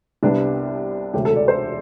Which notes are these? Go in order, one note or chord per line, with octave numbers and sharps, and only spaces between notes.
C2 C3 G3 B3 D4
E1 D2 C3 G4
A4
D5
C5